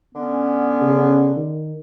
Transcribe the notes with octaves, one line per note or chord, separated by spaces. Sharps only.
D3 B3 C#4
C#3
D#3